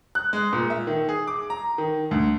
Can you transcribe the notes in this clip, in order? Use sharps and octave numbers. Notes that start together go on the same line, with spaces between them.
F#6
G#3
A#2
E5
D#3
G#4
D6
A#5
D#3
D2